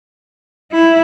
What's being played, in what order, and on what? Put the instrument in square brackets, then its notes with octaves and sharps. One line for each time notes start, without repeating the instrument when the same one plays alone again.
[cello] E4